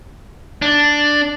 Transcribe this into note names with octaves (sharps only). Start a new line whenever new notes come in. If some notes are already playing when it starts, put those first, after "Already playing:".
D4